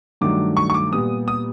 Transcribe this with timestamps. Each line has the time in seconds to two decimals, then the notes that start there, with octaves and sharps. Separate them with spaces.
0.21 G2 D#3 F#3 A3 D4 D6
0.57 C#6
0.70 C#6
0.74 D6
0.92 A#2 G3 B3 D#6
1.28 D#6